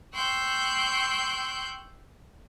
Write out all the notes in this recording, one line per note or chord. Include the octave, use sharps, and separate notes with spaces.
G5 C6 C#6 E6 F#6 G6